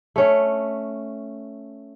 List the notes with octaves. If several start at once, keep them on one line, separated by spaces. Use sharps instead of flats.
A3 C#4